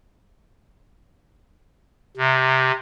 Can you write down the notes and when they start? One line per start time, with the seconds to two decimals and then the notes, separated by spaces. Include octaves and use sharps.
2.17 C3